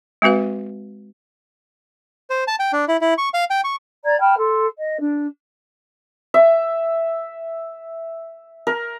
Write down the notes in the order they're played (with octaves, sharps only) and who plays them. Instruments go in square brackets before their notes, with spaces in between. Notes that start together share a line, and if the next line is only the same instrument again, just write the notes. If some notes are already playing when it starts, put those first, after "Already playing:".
[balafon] G#3 C4 F#4 B4 F5
[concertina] C5
A5
G5
D4
E4
E4
C#6
F5
G5
C#6
[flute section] D5 A#5 G#6
G5 A5 B5 F6
A4 C6
D#5
D4
[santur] E5
A#4